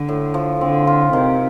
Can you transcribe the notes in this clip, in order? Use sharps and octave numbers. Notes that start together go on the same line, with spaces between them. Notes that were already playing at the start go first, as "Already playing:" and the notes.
Already playing: D3
A2
F3
D3 C4
F4
C3 D#3